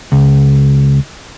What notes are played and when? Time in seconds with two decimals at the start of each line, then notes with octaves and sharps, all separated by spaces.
0.12 C#2